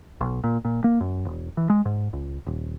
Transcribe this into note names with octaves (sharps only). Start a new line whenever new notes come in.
B1
A#2
A#2
A#3
F#2
E1
E3
G#3
G#2
C#2
D#1